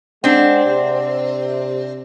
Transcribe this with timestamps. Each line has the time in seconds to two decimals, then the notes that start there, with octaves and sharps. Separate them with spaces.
0.24 G#3 C4 D4 F#5
0.65 C3